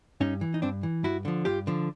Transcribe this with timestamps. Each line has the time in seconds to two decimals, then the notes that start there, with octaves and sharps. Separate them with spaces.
0.21 G2 C#4 D#4
0.41 E3
0.54 D#4
0.62 G2 C4 D4
0.83 E3
1.03 G2 E4 F#4
1.25 D3 F3
1.45 G2 F4 G4
1.67 D3 F3